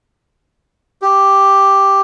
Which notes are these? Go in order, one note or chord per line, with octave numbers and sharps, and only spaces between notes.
G4